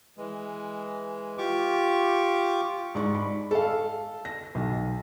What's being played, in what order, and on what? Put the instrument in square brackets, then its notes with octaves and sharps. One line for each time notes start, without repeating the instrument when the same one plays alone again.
[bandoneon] E3 G#3
F4 G4 C#6 D6
[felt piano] G#2 D5 C#6
B5
A4 F5
A#6
B1